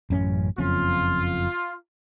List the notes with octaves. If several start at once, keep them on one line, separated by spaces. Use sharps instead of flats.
A1 F#2 C#4
F#1 F2 C#4 F4